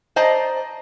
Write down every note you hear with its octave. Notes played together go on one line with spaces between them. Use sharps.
C5 D5 D#5 A5 A#5